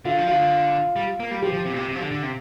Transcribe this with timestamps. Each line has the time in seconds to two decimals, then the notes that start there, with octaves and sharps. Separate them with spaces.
0.05 D3 F4
0.18 F3
0.28 D3 F4
0.96 G3
1.20 A#3
1.31 G3
1.42 F3 G4
1.53 F3
1.66 C3
1.73 A#2
1.76 C3
1.88 C3
1.96 F3
2.00 D3
2.11 D3
2.23 C3